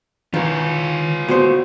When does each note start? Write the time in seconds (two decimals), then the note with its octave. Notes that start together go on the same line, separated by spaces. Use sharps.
0.34 D#3 E3 F4 B4
1.29 A2 B3 F#4 C5